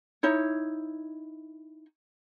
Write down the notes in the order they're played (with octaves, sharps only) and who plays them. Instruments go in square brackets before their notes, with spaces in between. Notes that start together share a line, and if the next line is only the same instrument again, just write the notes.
[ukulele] D#4 E4 C#5